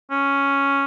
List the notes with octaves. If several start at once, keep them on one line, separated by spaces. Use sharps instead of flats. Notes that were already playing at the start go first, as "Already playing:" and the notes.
C#4